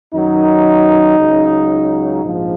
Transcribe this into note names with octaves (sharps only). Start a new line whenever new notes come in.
F#2 D#3 F#3 D#4
C#2 C#3 F#3
A#1 G#2 F3